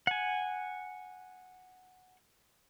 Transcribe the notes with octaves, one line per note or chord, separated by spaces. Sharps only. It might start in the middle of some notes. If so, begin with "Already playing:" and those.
F#5 G#5